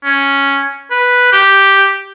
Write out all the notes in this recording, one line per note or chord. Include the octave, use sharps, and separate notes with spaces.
C#4
B4
G4